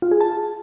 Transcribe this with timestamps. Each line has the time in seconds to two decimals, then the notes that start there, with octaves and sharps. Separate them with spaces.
0.02 F4
0.11 G#4
0.21 A5